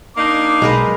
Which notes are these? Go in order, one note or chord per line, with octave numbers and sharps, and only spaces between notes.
A#3 D4 D#4 D6
B1 G#3 A#4 B4